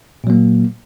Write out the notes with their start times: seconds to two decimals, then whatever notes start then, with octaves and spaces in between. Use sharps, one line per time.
0.24 A#2
0.27 F#3
0.30 A#3